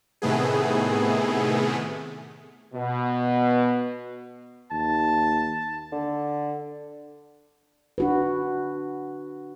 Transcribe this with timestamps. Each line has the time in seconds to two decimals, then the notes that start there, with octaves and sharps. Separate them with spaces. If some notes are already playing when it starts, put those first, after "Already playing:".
0.22 A2 C3 D#3 A3 B3 G#4
2.74 B2
4.72 D#2 A5
5.92 D3
7.98 D4 F#4 B4